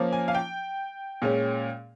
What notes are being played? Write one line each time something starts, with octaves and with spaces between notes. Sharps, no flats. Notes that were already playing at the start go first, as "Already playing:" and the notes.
Already playing: F3 A#3 C#4
G#5
F5
G5
A#2 G#3 C#4